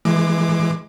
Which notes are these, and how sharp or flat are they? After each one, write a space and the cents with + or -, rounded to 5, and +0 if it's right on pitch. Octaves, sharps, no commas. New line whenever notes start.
E3 +5 G#3 +15 D6 +25